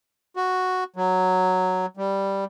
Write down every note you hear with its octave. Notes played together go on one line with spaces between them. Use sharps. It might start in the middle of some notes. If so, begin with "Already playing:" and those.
F#4
F#3
G3